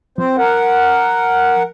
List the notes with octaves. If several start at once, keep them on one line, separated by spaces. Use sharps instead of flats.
F3 C4 C5
A#4 F#5